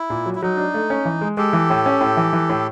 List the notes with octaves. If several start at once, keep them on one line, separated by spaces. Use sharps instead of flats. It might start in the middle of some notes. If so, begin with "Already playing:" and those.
Already playing: E4
A#2
F#3
E4
F#3 D#4
D4
A3
C#4
E3
G#3
G#3 G4 A4
E3
A2
C#4
A2
E3
E3
A2